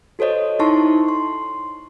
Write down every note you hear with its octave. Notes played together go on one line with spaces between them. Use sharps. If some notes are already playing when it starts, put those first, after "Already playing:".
F#4 A4 C5 C#5 D#5
D#4 E4 A5 C6 C#6
C6